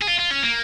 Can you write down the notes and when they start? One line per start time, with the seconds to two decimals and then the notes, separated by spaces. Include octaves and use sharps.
0.02 G#4
0.08 F4
0.20 F4
0.31 C#4
0.43 A#3